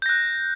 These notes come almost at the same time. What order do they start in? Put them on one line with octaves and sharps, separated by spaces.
G6 A#6 F#6